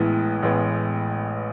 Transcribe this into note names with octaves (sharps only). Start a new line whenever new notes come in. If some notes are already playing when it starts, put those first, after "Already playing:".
Already playing: A1 A2 E3 G#3 B3
A1 A2 E3 G#3 B3